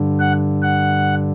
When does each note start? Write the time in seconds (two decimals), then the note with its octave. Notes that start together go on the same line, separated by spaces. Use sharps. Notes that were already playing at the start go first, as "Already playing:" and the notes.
Already playing: G2 D3
0.20 F#5
0.63 F#5